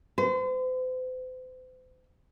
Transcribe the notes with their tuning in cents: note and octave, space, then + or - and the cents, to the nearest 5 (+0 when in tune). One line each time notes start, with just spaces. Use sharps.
C5 -40